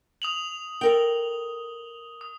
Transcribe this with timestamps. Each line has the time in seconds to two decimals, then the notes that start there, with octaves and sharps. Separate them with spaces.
0.22 D#6 F7 F#7
0.81 A4 A#4 G5 G7
2.21 D#6